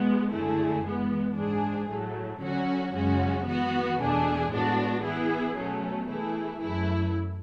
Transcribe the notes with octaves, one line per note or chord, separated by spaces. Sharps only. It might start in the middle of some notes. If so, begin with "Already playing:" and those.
Already playing: B2 G#3 B3
F#2 D3 A3 E4 G#4
E3 G#3 B3
G#2 G#3 D4 G#4
A2 F#3 A3
D3 F#3 C#4 F#4
F#2 C#3 G#3 C#4 F#4
E3 B3 F#4
E2 B2 A3 D4 G#4
A2 G#3 B3 D4 F#4
E3 B3 E4 G#4
B2 F#3 A3 C#4
E3 A3 E4 G#4
F#2 E3 A3 E4